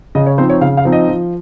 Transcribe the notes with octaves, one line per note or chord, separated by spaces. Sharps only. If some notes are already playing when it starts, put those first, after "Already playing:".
C#3 D#5
C#5
F3 C4 D#4 C5
C#5
C#3 F5
F5
F3 C4 D#4
D#5
F3